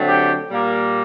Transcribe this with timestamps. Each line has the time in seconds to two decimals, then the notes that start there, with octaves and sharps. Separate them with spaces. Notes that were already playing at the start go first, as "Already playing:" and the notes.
Already playing: D3 F#3 A3 C4
0.08 G4
0.49 A#2 G3 A#3